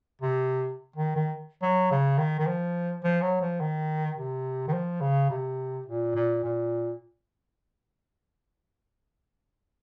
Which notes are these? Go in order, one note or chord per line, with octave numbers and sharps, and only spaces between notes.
C3
D#3
D#3
F#3
C#3
D#3
D#3
F3
F3
F#3
F3
D#3
C3
D#3
F3
C#3
C3
A#2
A#2
A#2